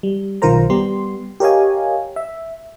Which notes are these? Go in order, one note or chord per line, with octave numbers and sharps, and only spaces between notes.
G3
B1 D#3 F4 A#4 C5 A#5
G3 B3 G4 C6
G4 A#4 C#5 D#5 F5 G#5
E5